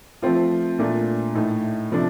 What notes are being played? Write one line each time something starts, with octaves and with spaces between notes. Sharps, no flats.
F3 A3 C4 F4
A#2 A3 D4 F4
A2 A3 D#4
C3 F3 A3 D4